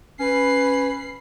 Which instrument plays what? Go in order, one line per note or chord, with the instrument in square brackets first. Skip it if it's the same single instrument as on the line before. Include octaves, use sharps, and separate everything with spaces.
[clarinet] C#4 [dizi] B4 [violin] B5 C7